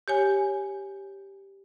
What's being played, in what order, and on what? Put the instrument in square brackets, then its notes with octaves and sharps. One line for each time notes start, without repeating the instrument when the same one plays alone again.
[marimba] G4 C#5 G#5